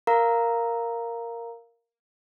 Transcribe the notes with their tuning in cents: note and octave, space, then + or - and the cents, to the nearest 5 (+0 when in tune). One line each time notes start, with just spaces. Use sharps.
A#4 +0 F5 -5 A#5 +0